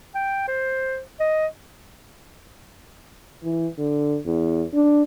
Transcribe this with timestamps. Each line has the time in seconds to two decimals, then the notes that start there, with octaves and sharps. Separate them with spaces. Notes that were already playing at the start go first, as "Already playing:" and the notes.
0.15 G5
0.48 C5
1.20 D#5
3.44 E3
3.78 D3
4.26 E2
4.74 D4